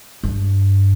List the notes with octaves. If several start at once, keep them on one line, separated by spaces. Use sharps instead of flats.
G2